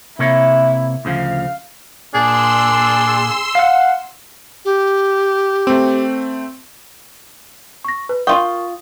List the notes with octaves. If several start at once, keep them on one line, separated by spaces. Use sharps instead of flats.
C3 A#3 E4 C#5
D2 C#3 F3 F5
A#2 D4 G#4 C6 E6
F5 F#5
G4
A3 C4
C#6 A#6
B4
F4 A#4 G5 C#6 D#6